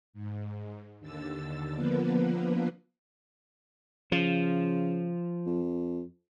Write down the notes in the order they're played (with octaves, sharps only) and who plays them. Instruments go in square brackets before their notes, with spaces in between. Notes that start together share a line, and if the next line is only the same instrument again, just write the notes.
[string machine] G#2
D#2 D3 E6 A6
D3 F3 A#3 B3 B4
[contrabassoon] C#3 [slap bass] F3
[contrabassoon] F2